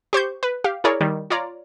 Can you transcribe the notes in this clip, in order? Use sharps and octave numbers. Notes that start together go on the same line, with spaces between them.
G4 C5 C#6 G6
B4
G4 F5
E4 G#4 A#4 C#5 D5
D#3 G3
F4 C#5 D5 A#5